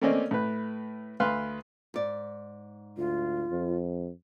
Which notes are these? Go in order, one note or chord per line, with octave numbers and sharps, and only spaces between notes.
A3 A#3 C4 C#4 D5 D#5
A2 B4
D2 B4 F5 C6
G#2 D5
D2 F4
F2